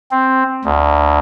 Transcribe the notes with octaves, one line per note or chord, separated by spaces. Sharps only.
C4
D2